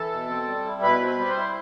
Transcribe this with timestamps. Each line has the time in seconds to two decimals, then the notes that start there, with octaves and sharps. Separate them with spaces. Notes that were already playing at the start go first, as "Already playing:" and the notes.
Already playing: E3 A4 A5
0.12 B2
0.29 C4
0.47 G3
0.65 E4
0.83 B2 B4 B5
1.01 C4
1.06 B4 B5
1.18 G3 B5
1.30 C5 C6
1.36 E4